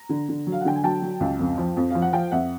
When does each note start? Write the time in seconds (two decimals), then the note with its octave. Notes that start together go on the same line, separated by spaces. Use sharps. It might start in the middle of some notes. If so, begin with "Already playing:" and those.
Already playing: A#5
0.09 D3
0.29 D3
0.47 F#3
0.52 F5
0.61 F#5
0.65 D3 G5
0.76 G#5
0.84 F#3 G5 A5
1.02 F#3
1.20 C#2
1.39 F2
1.58 F3
1.77 F2
1.90 F3 F5
2.02 F#5
2.13 F3 F5 G5
2.31 F2 E5 F#5